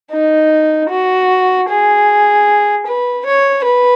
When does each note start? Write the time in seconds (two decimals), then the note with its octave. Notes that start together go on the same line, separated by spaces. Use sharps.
0.12 D#4
0.90 F#4
1.68 G#4
2.86 B4
3.25 C#5
3.65 B4